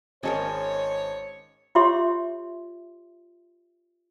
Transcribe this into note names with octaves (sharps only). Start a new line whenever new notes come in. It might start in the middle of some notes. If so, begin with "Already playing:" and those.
G#1 C#4 G#4 A#4 C5 C#5 D#5 A5
F4 G4 C#5 E5 C6 D6